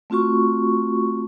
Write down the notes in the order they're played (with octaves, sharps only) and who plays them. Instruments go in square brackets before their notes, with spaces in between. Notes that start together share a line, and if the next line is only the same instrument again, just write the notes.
[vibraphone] A3 C4 F4 F#4 C#6